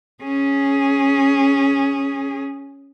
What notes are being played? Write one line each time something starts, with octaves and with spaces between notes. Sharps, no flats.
C#4 G#4